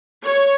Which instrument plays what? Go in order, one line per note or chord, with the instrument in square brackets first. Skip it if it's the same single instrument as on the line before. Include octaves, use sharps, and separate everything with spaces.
[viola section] C#5